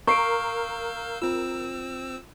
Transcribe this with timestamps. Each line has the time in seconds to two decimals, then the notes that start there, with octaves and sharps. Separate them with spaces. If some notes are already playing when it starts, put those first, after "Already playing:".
0.07 A#4 F5 C#6 E6 G6 C7 D7
1.22 C4 F4 E6